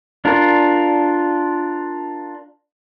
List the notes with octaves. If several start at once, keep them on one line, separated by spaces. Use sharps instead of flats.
D4 F4 A#4